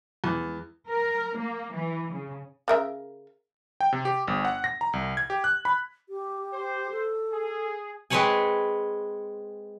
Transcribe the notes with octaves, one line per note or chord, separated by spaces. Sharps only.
E2
A#4
A#3
E3
C#3
C#3 A#4 E5
G5
C3
G4
G1
F#5
A#6
A#5
C2
G#6
G4
F#6
B5
G4
C5
A4
G#4
G#3 C4 B4 C#5 F#5 G#5